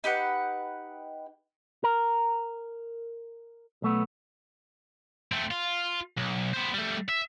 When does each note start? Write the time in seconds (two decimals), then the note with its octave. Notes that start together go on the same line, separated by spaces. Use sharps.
0.04 D#4 G4 B4 F#5
1.84 A#4
3.82 B1 A3 B3
5.32 A3 C4
5.51 F4
6.18 B1
6.54 B3 C5
6.74 G3 A3
7.09 E5